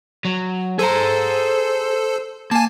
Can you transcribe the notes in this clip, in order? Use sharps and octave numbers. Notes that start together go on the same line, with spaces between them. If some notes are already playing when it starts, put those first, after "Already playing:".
F#3
G#4 A4 C5 A#5
A#3 G#5 A5